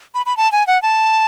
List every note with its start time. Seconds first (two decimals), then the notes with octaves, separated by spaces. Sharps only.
0.15 B5
0.26 B5
0.37 A5
0.52 G#5
0.67 F#5
0.82 A5